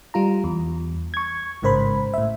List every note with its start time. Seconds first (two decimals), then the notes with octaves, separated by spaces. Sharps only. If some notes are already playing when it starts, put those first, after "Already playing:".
0.14 G3 F4 A#5
0.44 E2
1.14 C#6 G#6
1.62 A1 G#2 C#3 A#4 C5 B5
2.14 A2 E5